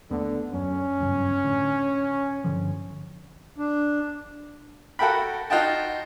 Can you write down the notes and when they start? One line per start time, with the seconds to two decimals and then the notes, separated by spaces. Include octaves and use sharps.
0.11 D#2 D3 A3 B3
0.53 F#2 C#4
1.00 G1 C#2 F#2
1.44 A2 D3
2.44 G2 D3 F3
3.58 D4
4.99 F#4 A4 A#4 G5 B5
5.50 D#4 F4 F#4 D#5 G5 A5